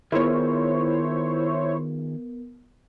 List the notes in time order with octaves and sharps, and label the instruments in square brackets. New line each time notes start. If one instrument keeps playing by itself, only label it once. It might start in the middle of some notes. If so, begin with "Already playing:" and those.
[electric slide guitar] D#3 F4 G#4 [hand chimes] B3 A#4 [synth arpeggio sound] E4 C5 C#5